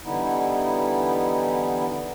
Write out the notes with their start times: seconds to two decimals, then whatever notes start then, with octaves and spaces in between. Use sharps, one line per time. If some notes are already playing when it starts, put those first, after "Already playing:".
0.04 D3 E3 G3 B3 D#4 E4